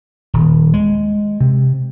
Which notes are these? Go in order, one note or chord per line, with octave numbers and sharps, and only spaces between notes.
D#1
G#3
C3